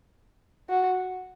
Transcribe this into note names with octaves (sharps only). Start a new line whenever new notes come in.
F#4